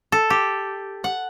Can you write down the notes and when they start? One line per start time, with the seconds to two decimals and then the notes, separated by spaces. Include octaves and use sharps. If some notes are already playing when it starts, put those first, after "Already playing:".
0.12 A4
0.30 G4
1.04 F#5